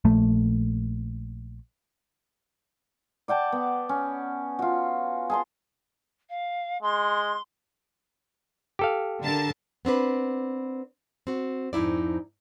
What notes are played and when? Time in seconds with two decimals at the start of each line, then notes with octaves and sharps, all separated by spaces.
0.05 A#1 A3
3.28 D5 F#5 G5 A5
3.52 B3
3.89 C#4
4.59 F4 F#4
5.30 G#4 A5 C6
6.29 F5
6.82 G#3 C6
8.79 G4 A4 F5
9.21 D3 A#4 A5
9.85 B3 C4 D4 B4
11.27 C4 F#4
11.73 F2 G#2 D#4 E4 D5